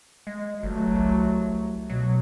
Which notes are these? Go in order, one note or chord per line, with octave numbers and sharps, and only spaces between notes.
G#3
G1 F#3 A3
C2
B2 F#3